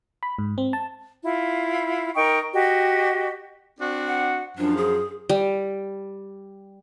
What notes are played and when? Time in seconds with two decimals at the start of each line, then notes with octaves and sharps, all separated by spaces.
0.23 B5
0.38 G#2
0.58 C4
0.73 A5
1.23 E4 F4
2.15 D#4 A#4 G5 C#6
2.53 F#4 G4 D#5
3.80 C4 D4 F#4
4.07 F#5
4.58 F#2 F3 D4
4.77 G#4
5.29 G3